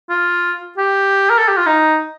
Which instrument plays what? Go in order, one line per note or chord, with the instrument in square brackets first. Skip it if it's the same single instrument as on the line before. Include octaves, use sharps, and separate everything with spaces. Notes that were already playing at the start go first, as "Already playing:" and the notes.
[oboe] F4
G4
A#4
A4
G4
F4
D#4